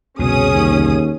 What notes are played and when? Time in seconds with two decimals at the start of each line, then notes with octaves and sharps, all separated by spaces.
0.19 C2 F2 B2 D3 C#4 G#4 D#6
0.54 D#2